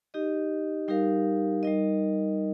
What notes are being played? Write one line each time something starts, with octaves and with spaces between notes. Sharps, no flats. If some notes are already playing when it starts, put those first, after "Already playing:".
D#4 G4 D#5
G3 D#4 G4 A#4 F5
G3 D#4 A#4 D#5